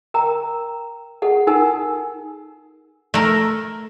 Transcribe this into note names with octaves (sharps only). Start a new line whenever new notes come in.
A#4 G5 A#5
G#4 A4 F#5
D#4 A4 A#4 F#5 G#5 E6
A3 A#4